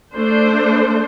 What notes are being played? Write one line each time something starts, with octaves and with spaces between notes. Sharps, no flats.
A3 D4 C5